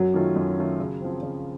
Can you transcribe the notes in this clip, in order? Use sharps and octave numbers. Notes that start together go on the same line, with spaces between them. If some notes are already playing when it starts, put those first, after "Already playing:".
Already playing: F#2 F#3
D#3 A3 C#4 F4
F#2
D#3 A3 C#4 F4
C#3
F3 C4
C#3